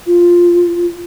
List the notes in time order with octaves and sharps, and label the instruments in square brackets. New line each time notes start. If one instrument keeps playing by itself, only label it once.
[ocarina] F4